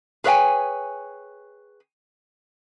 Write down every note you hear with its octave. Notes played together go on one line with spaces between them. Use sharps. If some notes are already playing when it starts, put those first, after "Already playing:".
G#4 B4 C#5 E5 G5 G#5